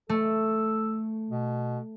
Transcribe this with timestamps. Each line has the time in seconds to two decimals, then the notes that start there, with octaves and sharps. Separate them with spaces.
0.09 A3 A4
1.30 B2